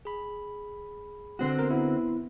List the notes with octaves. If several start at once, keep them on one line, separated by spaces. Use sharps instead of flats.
G#4 B5
D3 C4 F#4
B3 A#4
B3 E4